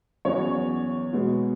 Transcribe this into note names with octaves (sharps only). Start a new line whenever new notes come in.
E2 C#3 F#3 B3 C#5
B2 G#3 B3